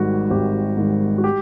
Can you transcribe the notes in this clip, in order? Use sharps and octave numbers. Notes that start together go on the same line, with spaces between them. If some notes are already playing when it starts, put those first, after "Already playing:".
Already playing: G#1 G#2 D#3 G3 F#4
G#1 G4
G#2 D#3 G3
F#4
G4